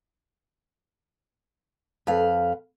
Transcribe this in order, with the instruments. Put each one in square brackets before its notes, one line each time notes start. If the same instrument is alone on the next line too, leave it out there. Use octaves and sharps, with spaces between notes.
[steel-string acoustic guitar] F2 B4 F5